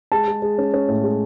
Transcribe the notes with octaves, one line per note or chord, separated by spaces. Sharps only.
G#3 A5
G#3
G#3
C#4
C#4
A2
G#3